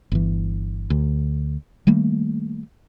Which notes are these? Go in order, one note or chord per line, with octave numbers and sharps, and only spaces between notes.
G1 E3
D2
D#3 G3 A3 A#3